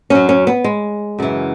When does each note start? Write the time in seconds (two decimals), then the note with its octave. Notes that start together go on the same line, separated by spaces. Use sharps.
0.10 F#2 F#3 C#4
0.29 C#4
0.47 B3
0.64 G#3
1.19 F#2 C#3 E3